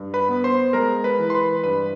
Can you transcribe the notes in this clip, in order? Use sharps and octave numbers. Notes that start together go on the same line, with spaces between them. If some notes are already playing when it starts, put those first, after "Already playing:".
Already playing: G2
B4 B5
B3
C5 C6
G#3 A#4 A#5
B4 B5
E3
C6
B4 B5
G2 B4 B5